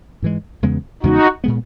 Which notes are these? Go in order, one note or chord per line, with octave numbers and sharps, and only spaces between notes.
G#2 E3 G#3
E2 C#3 G#3 B3
E2 C#3 G#3 B3 D#4 F#4
A#2 G#3 B3